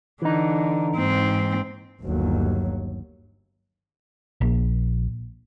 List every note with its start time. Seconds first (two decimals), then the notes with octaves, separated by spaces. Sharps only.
0.22 D3 E3 D#4
0.97 G#2 C4
2.03 G1 D#2 F#3
4.41 A#1